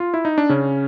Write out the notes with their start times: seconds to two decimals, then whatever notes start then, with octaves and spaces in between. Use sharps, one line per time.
0.00 F4
0.14 E4
0.25 D#4
0.38 D4
0.49 C#3 C#4